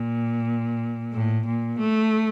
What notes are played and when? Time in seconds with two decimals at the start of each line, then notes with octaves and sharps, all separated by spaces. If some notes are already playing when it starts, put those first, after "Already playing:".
Already playing: A#2
1.13 A2
1.46 A#2
1.79 A3